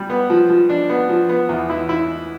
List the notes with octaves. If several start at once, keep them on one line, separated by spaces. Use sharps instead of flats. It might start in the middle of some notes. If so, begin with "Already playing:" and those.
Already playing: G3
B3
F3
F3
D4
B3
F3
B3
E2
E4
E4